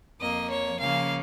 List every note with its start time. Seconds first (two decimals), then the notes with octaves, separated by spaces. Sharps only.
0.21 F2 F3 A#3 D#5
0.50 C#5
0.79 C#3 F3 A#3 C#4 F5